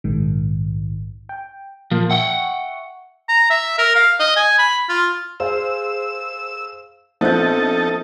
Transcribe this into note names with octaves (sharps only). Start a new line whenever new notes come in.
A#1 G#2 D#3
G5
A#2 F3 A#3 F5
E5 F#5 G5 C#6
A#5
E5
A#4
F5
D#5
G#5
B5
F4
G#4 C5 F5 E6
A#1 B3 C4 D#4 F4 A4 F#6 G6